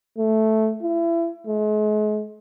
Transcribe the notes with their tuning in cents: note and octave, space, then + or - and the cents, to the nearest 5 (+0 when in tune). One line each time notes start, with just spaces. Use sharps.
A3 -5
E4 +30
G#3 +40